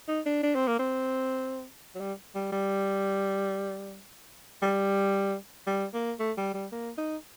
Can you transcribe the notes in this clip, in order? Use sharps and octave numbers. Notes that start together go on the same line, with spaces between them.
D#4
D4
D4
C4
A#3
C4
F#3
G3
G3
G3
G3
G3
A#3
A3
G3
G3
A#3
D#4